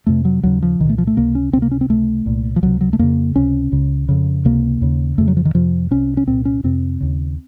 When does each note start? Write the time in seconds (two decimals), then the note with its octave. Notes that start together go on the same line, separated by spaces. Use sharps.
0.07 F2 C3 A3
0.25 F#3
0.43 D#2 C#3 F#3
0.62 F3
0.80 C2 D#3
0.85 A#2 A3
0.98 F3
1.07 A3
1.17 C#2 C3 A#3
1.35 C#4
1.53 C#2 C4
1.57 C3
1.62 A#3
1.71 C#4
1.81 C4
1.89 C#2 C3 A3
2.26 C2 A#2
2.56 F3
2.62 C#2 C3 F#3
2.81 F#3
2.93 A3
2.99 F2 C#3 A#3
3.36 C#2 C3 C#4
3.72 C#2 C#3
4.09 F2 C#3
4.45 C#2 C3 A#3
4.81 D#2 C#3
5.18 F2 C#3 A3
5.28 F#3
5.37 F3
5.45 D#3
5.54 F2 C3 F3
5.91 C2 C3 C#4
6.17 C#4
6.27 C2 A#2 C4
6.45 C#4
6.64 F2 C3 C4
7.01 D#2 C#3